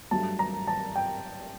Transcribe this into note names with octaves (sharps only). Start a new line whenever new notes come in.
G2 F#3 A3 A5
A#5
A5
G5